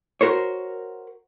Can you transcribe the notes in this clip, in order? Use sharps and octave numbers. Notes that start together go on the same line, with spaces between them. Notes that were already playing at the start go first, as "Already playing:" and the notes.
F#4 A#4 C5 C#5